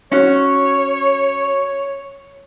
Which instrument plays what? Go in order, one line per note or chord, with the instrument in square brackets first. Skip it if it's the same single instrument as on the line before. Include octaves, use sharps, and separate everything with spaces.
[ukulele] C#4 F#4 [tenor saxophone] C#5